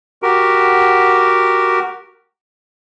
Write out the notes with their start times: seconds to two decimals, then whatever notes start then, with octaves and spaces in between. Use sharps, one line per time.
0.22 F#4 G4 A#4